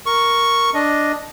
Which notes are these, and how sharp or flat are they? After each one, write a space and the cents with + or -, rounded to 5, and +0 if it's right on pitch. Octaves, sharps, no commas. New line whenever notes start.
A#4 +0 C#6 +0
D4 +0 D#5 +0